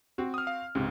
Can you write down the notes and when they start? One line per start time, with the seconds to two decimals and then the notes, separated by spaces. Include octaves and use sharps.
0.18 C4 F#4
0.34 D#6 F6
0.47 F5
0.75 C#2 G#2 C3